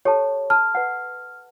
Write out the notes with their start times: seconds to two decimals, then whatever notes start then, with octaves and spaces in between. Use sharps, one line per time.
0.05 G4 A4 C#5 A5
0.50 A5 F6
0.75 B4 F#5